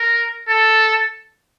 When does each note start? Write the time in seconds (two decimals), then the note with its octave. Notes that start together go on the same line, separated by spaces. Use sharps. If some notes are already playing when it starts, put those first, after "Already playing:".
Already playing: A#4
0.49 A4